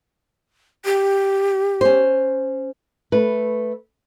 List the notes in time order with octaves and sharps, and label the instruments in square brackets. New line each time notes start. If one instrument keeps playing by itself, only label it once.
[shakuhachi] G4
[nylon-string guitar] C#4 C5
A3 B4